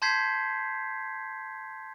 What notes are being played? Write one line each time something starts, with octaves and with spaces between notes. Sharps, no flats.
A5 C6 G6 G#6 B6 C7